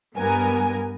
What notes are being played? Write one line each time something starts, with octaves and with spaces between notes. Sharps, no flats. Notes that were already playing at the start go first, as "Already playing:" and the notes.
G2 B3 A#4 G#5